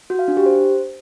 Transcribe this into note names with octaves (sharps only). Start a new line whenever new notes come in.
F#4
F5
D4
G4
C5